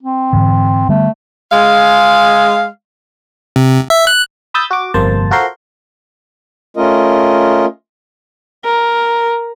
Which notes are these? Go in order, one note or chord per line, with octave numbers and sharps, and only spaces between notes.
C4
G#2 D3 E3
D3 G3 A3 B3
G#3 F5
C3
E5
F#6
B5 D#6 E6 G6 A6
F#4 D6
G1 F2 C3 A#3 C5 A5
F4 F#4 A4 A#4 C5 C6
A3 C#4 F4 A#4 D#5
A#4